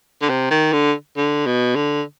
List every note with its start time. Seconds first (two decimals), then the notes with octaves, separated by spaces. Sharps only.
0.22 D3
0.29 C3
0.51 D#3
0.73 D3
1.17 D3
1.46 B2
1.76 D3